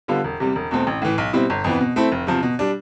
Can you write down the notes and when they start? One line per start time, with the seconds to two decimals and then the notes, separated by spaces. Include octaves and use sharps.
0.08 D3 G3 B3 F4
0.24 E1
0.40 E2 C3 G3
0.56 E1
0.71 E2 B2 A3 C4
0.87 A1
1.02 A2 E3
1.18 B1
1.33 B2 G3 C4 E4
1.50 G1
1.64 F2 E3 B3
1.81 B2
1.96 A3 C4 E4
2.12 F1
2.27 E2 C3 F3
2.43 B2
2.59 G3 D4